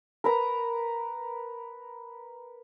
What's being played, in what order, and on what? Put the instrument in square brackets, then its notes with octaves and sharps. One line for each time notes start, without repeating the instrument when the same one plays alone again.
[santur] A#4 B4 A#5